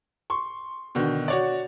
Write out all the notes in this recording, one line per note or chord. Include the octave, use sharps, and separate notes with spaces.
C6 C#6
B2 D3 D#3
F#4 C#5 D5